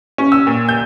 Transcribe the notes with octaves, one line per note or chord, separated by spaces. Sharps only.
C#4
E6
A#2
G6